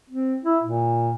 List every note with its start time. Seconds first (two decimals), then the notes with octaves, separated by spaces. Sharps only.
0.10 C4
0.44 E4
0.64 A#2